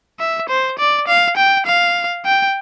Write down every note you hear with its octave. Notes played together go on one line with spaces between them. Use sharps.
E5
C5
D5
F5
G5
F5
G5